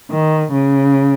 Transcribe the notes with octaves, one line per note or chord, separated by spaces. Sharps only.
D#3
C#3